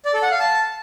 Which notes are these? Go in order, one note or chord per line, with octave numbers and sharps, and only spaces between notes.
D5
A4
F#5
F5
A5